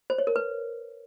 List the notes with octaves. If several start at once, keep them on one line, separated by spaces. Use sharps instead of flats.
C5
C#5
A#4
B4